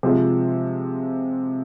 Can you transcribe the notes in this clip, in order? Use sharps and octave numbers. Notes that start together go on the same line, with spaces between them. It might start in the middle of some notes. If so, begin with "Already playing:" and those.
C3 F3 G#3